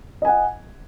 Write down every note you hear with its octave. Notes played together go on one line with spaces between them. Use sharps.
D#5 F#5 G#5